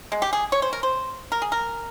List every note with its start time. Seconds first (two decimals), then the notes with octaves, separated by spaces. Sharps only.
0.12 G#3
0.22 G4
0.33 G#4
0.52 C#5
0.62 C5
0.73 A#4
0.83 C5
1.32 A#4
1.42 G#4
1.52 A#4